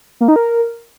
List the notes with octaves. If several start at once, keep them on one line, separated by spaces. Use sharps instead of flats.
A#3
D#4
A#4